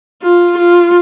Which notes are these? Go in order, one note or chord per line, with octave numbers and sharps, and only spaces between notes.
F4
F4